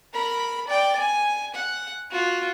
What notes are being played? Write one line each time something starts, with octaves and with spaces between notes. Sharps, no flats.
A#4 B5
D5 G5
G#5
F#5
F4 F#4